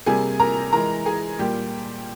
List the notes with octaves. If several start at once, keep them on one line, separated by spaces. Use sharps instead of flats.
C3 G3 A#3 G#4 G#5
A#4 A#5
E3 G#3 A#4 A#5
G#4 G#5
A#2 G3 A#3 G4 G5